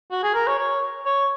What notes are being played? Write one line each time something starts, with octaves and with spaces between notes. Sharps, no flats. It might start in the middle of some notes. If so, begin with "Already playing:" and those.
F#4
G#4
A#4
C#5
C#5
C#5